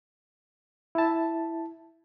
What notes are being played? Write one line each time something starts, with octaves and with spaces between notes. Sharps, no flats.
E4 A5